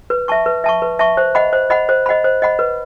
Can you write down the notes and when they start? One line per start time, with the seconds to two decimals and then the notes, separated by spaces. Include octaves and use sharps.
0.10 B4
0.28 E5 A5 C#6
0.46 B4
0.64 E5 A5 C#6
0.82 B4
0.99 E5 A5 C#6
1.17 C5
1.35 D#5 F#5 B5
1.53 C5
1.70 D#5 F#5 B5
1.89 C5
2.06 D#5 F#5 B5
2.24 C5
2.42 D#5 F#5 B5
2.59 B4